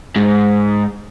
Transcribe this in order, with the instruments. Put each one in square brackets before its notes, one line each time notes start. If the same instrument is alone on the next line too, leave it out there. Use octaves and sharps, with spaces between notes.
[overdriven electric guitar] G#2